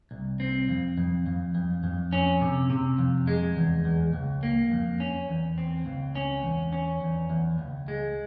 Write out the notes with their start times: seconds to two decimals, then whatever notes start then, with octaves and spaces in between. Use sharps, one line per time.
0.11 C2
0.40 C4
0.69 F2
0.97 F2
1.27 F2
1.55 F2
1.84 F2
2.13 C#4
2.41 C3
2.70 C3
2.98 F2
3.27 G#3
3.56 E2
3.85 E2
4.13 C#2
4.43 A#3
4.72 F2
5.00 C#4
5.29 E2
5.58 C4
5.86 C#2
6.15 C#4
6.44 E2
6.73 C#4
7.01 E2
7.30 E2
7.59 C#2
7.88 G#3